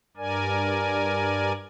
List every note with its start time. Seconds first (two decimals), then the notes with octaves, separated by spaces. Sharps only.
0.17 G2 A#4 D5 G#5